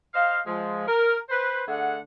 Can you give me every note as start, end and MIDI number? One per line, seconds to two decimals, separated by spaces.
0.14 0.41 72
0.14 0.41 75
0.14 0.41 77
0.47 0.85 53
0.47 0.85 56
0.88 1.18 70
1.29 1.63 71
1.29 1.63 72
1.68 1.98 50
1.68 1.98 57
1.68 1.98 68
1.68 1.98 78